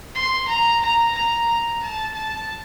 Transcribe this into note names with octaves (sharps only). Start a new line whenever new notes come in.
C6
A#5
A#5
A#5
A#5
A5
A5